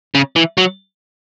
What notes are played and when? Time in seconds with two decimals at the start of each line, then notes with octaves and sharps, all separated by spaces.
0.15 C#3
0.36 E3
0.58 F#3